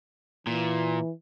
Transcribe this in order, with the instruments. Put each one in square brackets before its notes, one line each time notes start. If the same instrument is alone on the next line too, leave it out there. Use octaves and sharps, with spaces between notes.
[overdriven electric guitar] A#2 [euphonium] E3